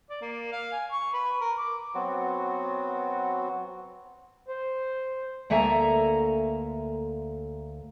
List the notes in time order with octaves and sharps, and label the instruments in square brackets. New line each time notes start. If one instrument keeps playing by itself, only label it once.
[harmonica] D5
A#3
F5
G#5
C#6
B4
A#4
D6
[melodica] F#3 B3 C4 F#4
[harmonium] C5
[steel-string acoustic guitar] D2 A#3 A4 E5 G#5 A#5